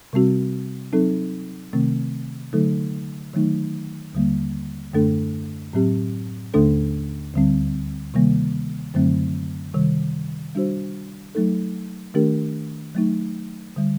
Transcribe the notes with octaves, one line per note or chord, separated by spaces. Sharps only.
C3 G3 C4 F#4
F#3 C4 D#4 A4
C3 D#3 A3 C4
D3 F#3 A3 D#4 A4
D#3 F#3 A3 D#4
D#2 D3 G3 A#3
F#2 D3 A3 D4 A4
A2 F#3 C4 G4
D#2 D3 A3 D4 A4
D2 D3 G3 C4
C3 D#3 G3 A#3
F#2 D3 F#3 A3 C4
C3 D#3 G3
G3 D4 F#4 C5
F#3 A3 D#4 A4
D#3 A3 D4 G4 A#4
F#3 A3 D#4
D3 G3